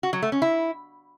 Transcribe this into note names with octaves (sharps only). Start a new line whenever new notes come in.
F#4
F#3
A3
C#4
E4